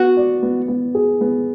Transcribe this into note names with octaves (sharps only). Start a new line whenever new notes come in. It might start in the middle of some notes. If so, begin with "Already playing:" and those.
Already playing: B3 F#4
D5
B3
B3
G#4
B3